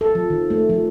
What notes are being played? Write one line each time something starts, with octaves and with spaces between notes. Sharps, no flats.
A4
F3
D#3
A3
F3